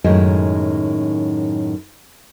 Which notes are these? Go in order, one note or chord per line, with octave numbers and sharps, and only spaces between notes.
F#2 A2 D#3 G#3